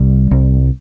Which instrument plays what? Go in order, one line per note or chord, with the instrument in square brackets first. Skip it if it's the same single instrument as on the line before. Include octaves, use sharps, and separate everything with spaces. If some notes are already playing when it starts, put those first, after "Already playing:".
Already playing: [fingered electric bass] C2 G3
C2